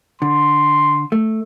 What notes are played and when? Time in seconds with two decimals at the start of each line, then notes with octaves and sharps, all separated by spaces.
0.22 D3 C6
1.12 A3